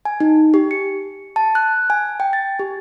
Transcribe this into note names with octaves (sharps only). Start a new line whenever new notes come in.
G#5
D#4
G4
C#7
A5
F#6
G#5
G5
A6
G4